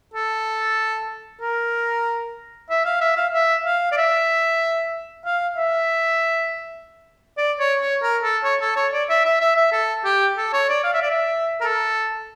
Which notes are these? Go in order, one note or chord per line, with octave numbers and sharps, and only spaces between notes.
A4
A#4
E5
F5
E5
F5
E5
F5
D5
E5
F5
E5
D5
C#5
C#5
A#4
A4
C#5
A4
C#5
D5
E5
E5
E5
E5
A4
G4
A4
C#5
D5
F5
E5
D5
E5
A#4
A4